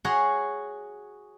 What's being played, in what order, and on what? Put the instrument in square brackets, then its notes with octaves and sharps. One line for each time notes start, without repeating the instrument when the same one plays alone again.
[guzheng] F#4 G#4 C#5 F#5 A#5 C6